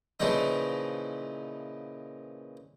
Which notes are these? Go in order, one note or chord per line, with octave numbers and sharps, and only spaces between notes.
A#2 C#3 E3 F3 D#4